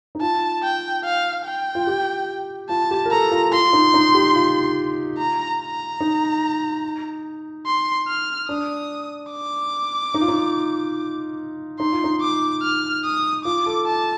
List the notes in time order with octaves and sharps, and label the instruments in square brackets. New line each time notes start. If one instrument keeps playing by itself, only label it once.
[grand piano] D#4
[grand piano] F4 [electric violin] A5
[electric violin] G5
F5
G5
[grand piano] F4
G4
[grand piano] F4 [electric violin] A5
[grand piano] G4
A#4
[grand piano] A4 [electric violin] A#5
[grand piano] F4
[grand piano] F4 [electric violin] C6
[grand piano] D#4
D#4
G4
F4
[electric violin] A#5
A#5
[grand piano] D#4
[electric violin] C6
F6
[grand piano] D4 [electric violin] D#6
[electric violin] D6
[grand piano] D#4
F4
D#4
[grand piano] D#4 [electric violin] C6
[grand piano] F4
D#4
[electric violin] D6
F6
D#6
[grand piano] F4 [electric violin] D6
[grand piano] A4
[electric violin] A5